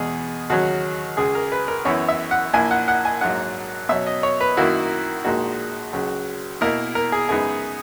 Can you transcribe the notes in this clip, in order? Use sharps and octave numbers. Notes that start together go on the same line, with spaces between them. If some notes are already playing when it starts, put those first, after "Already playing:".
Already playing: E2 B2 G#3 G#4
D#2 C#3 F#3 C#4 F#4
C#2 C#3 G#3 G#4
A#4
B4
A#4
F#2 E3 B3 E4 C#5
E5
F#5
A#1 A#2 A#3 E4 G#5
F#5
F#5
G#5
A#1 G#2 F#3 A#3 F#5
B2 F#3 C#4 E5
D#5
C#5
B4
F#2 D#3 A#3 E4 F#4
A#1 A#2 G#3 D#4 F#4
C#2 C#3 F#3
B2 A#3 E4 A#4
A#4
G#4
F#2 C#3 G#3 B3 D#4 G#4